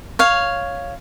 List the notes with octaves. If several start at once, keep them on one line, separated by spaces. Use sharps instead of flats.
C#5 F5